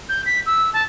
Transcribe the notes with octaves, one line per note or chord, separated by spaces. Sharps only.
G6
B6
E6
A5